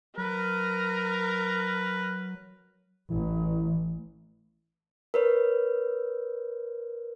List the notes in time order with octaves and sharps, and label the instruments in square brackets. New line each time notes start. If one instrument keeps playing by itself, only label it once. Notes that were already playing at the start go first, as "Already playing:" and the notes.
[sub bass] F#3 [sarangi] A#4 [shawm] B4
[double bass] A1 [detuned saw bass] E3
[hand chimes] A#4 B4 C#5